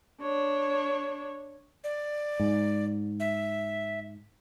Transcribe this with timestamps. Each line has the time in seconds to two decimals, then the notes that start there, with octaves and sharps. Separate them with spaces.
0.22 D4 C#5
1.84 D5
2.40 G#2
3.20 E5